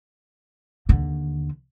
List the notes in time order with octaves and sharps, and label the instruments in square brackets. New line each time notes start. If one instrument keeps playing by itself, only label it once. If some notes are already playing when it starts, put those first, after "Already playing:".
[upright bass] D#2 D3